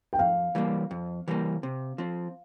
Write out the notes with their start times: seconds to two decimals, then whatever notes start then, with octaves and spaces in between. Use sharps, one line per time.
0.13 G5
0.19 F2 F5
0.55 E3 G3 A#3
0.91 F2
1.28 E3 G3 A#3
1.63 C3
1.98 F3 C4